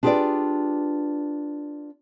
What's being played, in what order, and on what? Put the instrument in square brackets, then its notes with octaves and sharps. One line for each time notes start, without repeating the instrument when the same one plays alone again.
[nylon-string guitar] D4 F4 G4 G#4 B4 D5